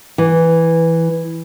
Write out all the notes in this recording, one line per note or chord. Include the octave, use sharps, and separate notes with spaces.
E3